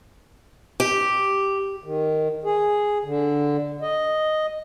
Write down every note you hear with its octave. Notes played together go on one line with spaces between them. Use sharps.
G4
D#3
G#4
D3
D#5